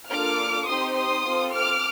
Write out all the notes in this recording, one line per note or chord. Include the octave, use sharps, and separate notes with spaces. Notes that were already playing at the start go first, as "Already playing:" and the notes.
A#3 D4 F4 A4 D6 F6
C4 D#4 G4 C6 D#6
C6 D#6
C4 F4 A4
D6 F6